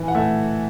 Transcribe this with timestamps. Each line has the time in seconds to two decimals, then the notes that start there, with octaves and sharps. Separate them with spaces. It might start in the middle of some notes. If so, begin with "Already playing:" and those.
Already playing: E3 G#5
0.08 F#5
0.15 A3 E5